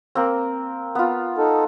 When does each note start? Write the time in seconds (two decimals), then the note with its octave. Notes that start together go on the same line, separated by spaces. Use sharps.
0.15 A#3 C4
0.95 B3 F4
1.37 D#4 A4